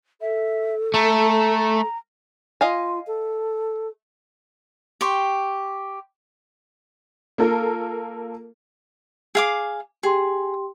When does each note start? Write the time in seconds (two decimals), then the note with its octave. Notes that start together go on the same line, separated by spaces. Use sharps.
0.21 A4 E5
0.94 A3 A#5
2.61 F4 D#5 F5 G#5
3.06 A4
5.01 G4 C6 C#6
7.38 A#3 F4 A4 A#4
9.35 G#4 F5 D6
10.03 G4 G#4 G5 C6